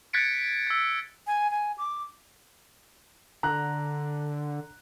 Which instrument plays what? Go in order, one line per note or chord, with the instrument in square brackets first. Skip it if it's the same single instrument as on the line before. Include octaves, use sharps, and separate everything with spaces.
[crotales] F#6 G#6 A6 B6 C#7 D7
E6 G#6
[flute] G#5
G#5
D6
[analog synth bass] D3 [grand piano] A#5 F#6